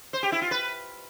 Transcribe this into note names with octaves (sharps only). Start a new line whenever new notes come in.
C5
G4
E4
F4
B4